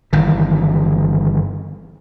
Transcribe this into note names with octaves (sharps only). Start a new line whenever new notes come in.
G1 D#3 E3